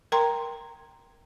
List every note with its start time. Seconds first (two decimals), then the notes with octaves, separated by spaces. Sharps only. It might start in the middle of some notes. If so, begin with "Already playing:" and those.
0.12 A#4 G5 A#5 C6